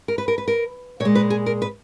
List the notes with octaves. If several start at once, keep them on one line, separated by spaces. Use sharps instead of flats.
A#4
B4
A#4
B4
A#4
A#2 C#5
G#3
B4
G#4
A#4
B4